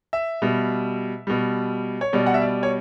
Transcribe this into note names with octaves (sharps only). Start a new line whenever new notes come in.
E5
B2 G3
B2 G3
C#5
B2 G3 D5
F#5
E5
D5
C#5